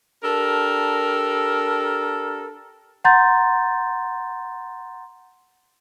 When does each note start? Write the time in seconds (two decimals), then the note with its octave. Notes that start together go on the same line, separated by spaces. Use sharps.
0.23 D4 G4 A4 A#4
3.04 F#5 A#5 C6 G6 A6